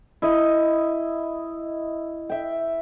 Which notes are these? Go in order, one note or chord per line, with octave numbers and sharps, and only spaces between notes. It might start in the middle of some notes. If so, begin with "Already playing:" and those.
E4 D#5
E5 G5